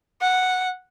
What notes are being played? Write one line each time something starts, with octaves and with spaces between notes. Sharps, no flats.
F#5